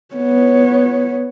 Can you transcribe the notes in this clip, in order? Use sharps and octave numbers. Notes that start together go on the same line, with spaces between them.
B3 C#5